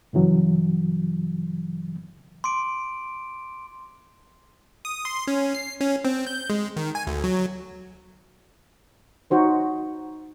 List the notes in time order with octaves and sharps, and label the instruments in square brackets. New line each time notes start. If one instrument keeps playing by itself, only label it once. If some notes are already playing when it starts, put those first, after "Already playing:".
[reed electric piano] G2 C#3 E3 F#3
[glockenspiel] C6 D6 D7
[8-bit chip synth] D#6
C6
C#4
C7
C#4
C4
G6
G#3
D#3
G#5
D2
F#3
[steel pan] D#4 F#4 C5 C#5